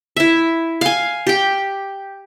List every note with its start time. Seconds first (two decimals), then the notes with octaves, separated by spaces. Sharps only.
0.16 E4 E5
0.81 F5 G#5
1.27 G4 G5